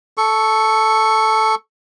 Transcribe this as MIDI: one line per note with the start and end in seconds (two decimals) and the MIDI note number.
0.17 1.55 69
0.17 1.55 85